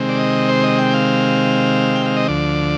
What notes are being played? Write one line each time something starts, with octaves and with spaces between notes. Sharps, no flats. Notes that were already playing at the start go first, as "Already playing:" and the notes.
Already playing: C3 D#3 G#3 C4
D5
D#5
C5
D#5
G5
F5
G5
F5
D#5
D2 D3 F3 D5